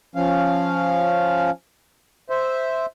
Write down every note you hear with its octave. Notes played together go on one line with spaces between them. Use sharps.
F3 C#4 F5
C5 E5